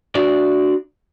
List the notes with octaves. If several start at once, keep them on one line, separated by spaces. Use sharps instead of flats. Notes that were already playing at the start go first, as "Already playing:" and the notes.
D4 F#4 D5